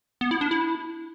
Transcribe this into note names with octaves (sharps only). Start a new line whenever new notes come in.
B3
E4
D4
E4